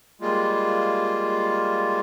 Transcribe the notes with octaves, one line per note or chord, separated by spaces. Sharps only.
G3 G#3 A#3 F4